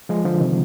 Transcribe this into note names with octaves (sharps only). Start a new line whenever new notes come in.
F3 G#3
D3 F3
C3 D#3